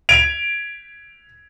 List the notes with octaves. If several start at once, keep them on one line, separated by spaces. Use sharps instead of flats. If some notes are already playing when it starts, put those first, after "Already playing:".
G#6 D7 F7